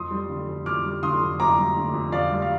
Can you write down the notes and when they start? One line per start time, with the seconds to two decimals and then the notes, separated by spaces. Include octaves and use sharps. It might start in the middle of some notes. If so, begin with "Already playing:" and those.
Already playing: F2 C6 D#6
0.11 G3
0.30 D3
0.48 F2
0.66 F2 D6 F6
0.84 G3
1.03 D3 C6 D#6
1.21 F2
1.40 F2 A#5 D6
1.58 G3
1.76 D3
1.94 F2
2.12 F2 D5 F5
2.31 G3
2.42 F5